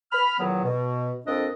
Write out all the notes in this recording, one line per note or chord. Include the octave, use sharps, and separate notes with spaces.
B5 F6
E2 A#2 D#3 F#3 B3
B2
F2 A#3 C4 D4 A4 D#5